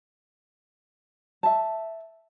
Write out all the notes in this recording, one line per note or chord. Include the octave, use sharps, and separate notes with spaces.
E5 A5